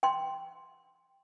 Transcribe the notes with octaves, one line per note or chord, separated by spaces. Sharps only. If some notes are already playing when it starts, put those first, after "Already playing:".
G5 C6